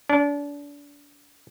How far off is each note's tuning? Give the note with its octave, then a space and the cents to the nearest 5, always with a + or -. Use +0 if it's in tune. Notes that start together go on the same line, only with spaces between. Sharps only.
D4 -35